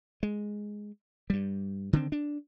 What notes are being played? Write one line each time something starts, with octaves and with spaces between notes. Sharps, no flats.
G#3
G2 G3
D3 D#3 C4
D4